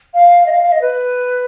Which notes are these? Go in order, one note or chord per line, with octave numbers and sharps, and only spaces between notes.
F5
D#5
F5
F5
D#5
B4